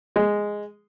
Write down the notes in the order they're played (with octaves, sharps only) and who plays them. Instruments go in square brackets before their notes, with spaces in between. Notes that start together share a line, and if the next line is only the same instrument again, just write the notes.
[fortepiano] G#3